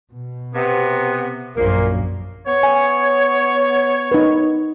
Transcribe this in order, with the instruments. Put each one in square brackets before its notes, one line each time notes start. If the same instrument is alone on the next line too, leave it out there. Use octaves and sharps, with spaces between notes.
[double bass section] B2
[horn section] C3 B3
[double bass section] A#1 F#2 [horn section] A#2 F3 A#3
[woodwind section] B3 C#5
[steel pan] G#5
D#4 B4